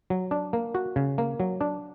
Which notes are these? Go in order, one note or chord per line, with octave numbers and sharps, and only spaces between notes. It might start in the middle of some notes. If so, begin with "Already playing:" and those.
F#3
D4
A#3
F#4
C#3
A#3
F#3
D4